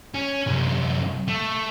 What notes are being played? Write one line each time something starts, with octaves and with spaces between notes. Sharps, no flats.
C#4
F#2 C3
A3